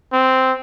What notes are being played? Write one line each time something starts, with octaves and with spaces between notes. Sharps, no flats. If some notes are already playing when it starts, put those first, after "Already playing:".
C4